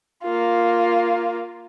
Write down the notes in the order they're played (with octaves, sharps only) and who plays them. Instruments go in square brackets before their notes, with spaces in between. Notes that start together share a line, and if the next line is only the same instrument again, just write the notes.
[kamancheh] A#3 F4